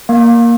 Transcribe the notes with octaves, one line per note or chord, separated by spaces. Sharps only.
A#3